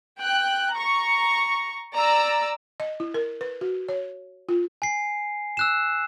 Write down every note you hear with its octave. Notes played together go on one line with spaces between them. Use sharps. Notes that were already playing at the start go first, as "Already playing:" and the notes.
G5 F#6
A#5 C#6
D5 A#5 E6
D#5
E4
A#4
B4
F#4
C#5
F4
G#5 C7
E6 F#6 E7